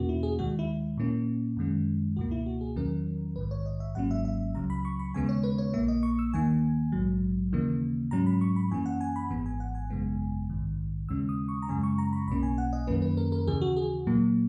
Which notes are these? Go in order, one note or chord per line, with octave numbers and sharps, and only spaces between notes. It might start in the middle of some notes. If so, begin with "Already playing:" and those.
Already playing: E2 B2 A#3 C#4 F#4
E4
G#4
D#2 D#3 G#3 F#4
E4
A#2 A#3 C#4
F#2 D#3 G#3 C#4
C#2 B2 A#3 F#4
E4
F#4
G#4
E2 D#3 F#3 C#4 A#4
A#1 G#2 D#3 B4
C#5
D#5
E5
G#1 G#2 F#3 A#3 C#4 F#5
E5
E5
C#2 C#3 F#3 A#5
B5
C#6
B5
D#2 C#3 G#3 B3 G#5
C#5
B4
C#5
A#1 A#2 A#3 E5
D#5
C#6
E6
D#2 D#3 A#3 G#5
A#1 G#2 F#3
D#2 C#3 E3 A#3
G#2 F#3 C#4 A#5
B5
C#6
B5
F#2 E3 A#3 C#4 G#5
F#5
G#5
B5
G#1 G#2 E3 B3
G#5
F#5
G#5
G#1 F#2 C#3 G#3 B3
A#1 G#2 D#3
D#2 C#3 G#3 C#4 E6
D#6
C#6
A#5
F#2 C#3 G#3 C#4 G#5
C#6
A#5
B5
B1 B2 A#3 C#4 B5
G#5
F#5
D#5
F#2 D#3 A#3 C#4 B4
B4
A#4
A#4
D#2 C#3 E3 G#4
F#4
G#4
A#2 F#3 A#3